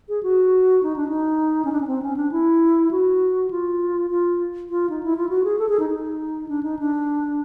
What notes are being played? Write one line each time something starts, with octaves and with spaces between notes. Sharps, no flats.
G#4
F#4
D#4
D4
D#4
C#4
D4
C#4
C4
C#4
D4
E4
F#4
F4
F4
F4
D#4
E4
F4
F#4
G#4
A4
G#4
D#4
D#4
D4
D#4
D4